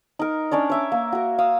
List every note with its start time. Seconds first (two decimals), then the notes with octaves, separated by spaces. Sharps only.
0.19 D#4 A#4
0.51 C#4 D4 C#5 D5
0.70 C#5 E5 D6
0.92 A#3
1.12 F#4 A#4
1.38 F5 D#6 E6